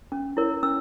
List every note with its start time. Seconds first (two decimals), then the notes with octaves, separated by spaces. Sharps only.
0.12 C#4
0.37 E4 A#4 C#5
0.63 C#4 E6